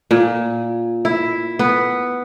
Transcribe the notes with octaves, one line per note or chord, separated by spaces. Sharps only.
A#2
E4
B3